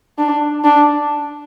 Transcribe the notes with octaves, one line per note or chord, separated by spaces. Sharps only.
D4
D4